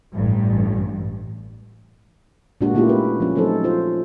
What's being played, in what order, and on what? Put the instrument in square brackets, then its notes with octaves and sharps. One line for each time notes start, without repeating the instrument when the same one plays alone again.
[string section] A1 G2
[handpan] A#2 G#3 A#3 D4 F#4 G4
A3 A#3 C#4 E4 F4 G4
B4
F3 C#4
F#3 A3 C4 D#4 A4 C5
F4 C5